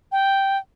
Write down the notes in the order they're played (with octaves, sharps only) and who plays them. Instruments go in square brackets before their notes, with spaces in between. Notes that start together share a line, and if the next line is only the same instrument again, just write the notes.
[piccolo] G5